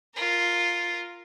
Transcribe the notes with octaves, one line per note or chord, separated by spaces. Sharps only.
F4 A#4